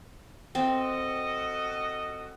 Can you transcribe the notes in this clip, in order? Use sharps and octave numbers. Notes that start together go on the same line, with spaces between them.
C4 F#4 A4 D#5